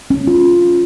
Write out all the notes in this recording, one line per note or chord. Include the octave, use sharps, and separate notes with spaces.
C#4
F4